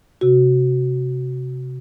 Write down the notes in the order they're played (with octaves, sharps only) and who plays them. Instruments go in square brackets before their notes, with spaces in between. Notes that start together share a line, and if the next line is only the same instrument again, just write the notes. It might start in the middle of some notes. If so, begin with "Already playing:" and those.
[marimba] C3 F#4